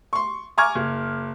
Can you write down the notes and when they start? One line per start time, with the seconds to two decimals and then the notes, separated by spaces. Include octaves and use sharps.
0.13 C6 C#6
0.58 G#5 A#5 C#6 D6 F6 G#6
0.75 F#1